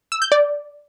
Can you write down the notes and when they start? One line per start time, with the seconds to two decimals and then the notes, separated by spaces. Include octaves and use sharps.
0.12 E6
0.22 G6
0.32 D5